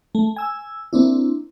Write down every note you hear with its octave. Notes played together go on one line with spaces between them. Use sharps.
A3
G#5 E6
A#3 C4 D4 E4